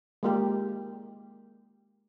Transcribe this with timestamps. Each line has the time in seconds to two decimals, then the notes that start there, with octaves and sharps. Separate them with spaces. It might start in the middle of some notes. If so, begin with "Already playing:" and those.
0.23 G#3 A#3 G4